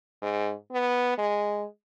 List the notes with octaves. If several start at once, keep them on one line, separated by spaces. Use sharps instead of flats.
G#2
B3
G#3